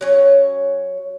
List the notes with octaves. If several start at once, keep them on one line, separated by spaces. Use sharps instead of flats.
F#3 C#4 C#5